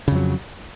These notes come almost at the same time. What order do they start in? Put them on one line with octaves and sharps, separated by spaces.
C#3 F2 F#3